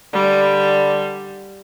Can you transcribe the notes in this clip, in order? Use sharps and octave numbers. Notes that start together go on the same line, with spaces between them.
D3 G3